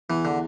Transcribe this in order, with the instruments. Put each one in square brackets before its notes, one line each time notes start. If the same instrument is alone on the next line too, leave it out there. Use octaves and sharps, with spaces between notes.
[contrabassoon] E2 [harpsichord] E3
[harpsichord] D3